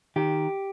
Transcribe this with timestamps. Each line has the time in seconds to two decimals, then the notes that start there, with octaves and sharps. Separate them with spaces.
0.16 D#3 G4